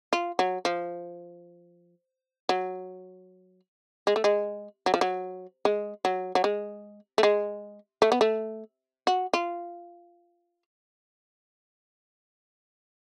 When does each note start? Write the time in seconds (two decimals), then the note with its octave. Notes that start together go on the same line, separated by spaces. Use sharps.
0.13 F4
0.39 F#3
0.65 F3
2.49 F#3
4.07 G#3
4.16 A3
4.24 G#3
4.86 F#3
4.94 F3
5.01 F#3
5.65 G#3
6.05 F#3
6.35 F#3
6.44 G#3
7.18 A3
7.23 G#3
8.02 A3
8.12 B3
8.21 A3
9.07 F#4
9.33 F4